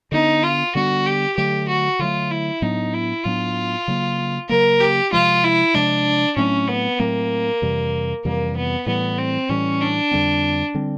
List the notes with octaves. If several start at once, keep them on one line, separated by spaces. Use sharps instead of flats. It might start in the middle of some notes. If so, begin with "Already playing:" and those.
D3 G3 B3 D4 D#4
F4
D3 G3 B3 D4 F#4
G4
D3 F#3 A3 G4
F#4
D3 F#3 A3 F4
E4
A2 F#3 B3 D4 D#4
E4
A2 F#3 B3 D4 F4
C#3 F#3 A#3
C#3 F#3 A#3 A#4
G4
C3 F3 G#3 F4
E4
C3 F3 G#3 D4
A2 F#3 A3 C4 C#4
B3
A2 F#3 A3 A#3 C4
F2 C3 E3 G3
F2 C3 E3 G3 A#3
B3
A2 E3 G3 B3
C4
A2 E3 G3 C#4
D4
F2 D3 G3 C4
D3 G3 C4